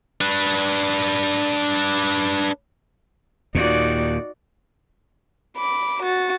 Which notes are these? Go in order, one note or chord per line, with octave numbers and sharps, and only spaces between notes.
D4 B4
D#2 A#2 D#4 F#4 D5
B5 D6
F#4 A6